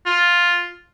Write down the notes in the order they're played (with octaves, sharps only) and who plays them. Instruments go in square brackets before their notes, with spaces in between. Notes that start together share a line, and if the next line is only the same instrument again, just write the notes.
[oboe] F4